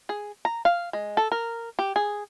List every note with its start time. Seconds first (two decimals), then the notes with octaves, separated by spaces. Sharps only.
0.09 G#4
0.45 A#5
0.65 F5
0.93 G#3
1.17 A4
1.32 A#4
1.79 G4
1.96 G#4